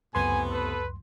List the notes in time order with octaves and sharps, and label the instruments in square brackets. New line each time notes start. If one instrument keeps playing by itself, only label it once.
[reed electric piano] C#2 F#2 C6 [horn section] A2 C3 B3 [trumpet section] G#5
[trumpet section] A4 B4